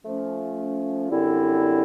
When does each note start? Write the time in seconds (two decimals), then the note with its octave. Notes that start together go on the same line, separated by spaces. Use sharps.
0.02 F3 A3 C#4
1.09 F#2 D3 G3 C4 E4